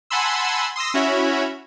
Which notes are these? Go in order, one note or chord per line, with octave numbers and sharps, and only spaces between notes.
F#5 G#5 A5 B5 C6 E6
C6 D#6 E6 A#6
C#4 E4 F#4 C#5 E5 B5